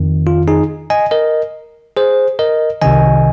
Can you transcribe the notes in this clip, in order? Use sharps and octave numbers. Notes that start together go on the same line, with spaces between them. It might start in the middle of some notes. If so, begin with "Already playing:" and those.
Already playing: F2 D#3
F4
D#4 G#4
D#5 G#5
A#4 D#5
G#4 C5
A#4 D#5
C2 C3 D#3 D#5 G#5